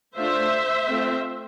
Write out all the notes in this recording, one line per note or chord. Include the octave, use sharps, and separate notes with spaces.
A3 D4 F4 C5 E5
A3 C4 F4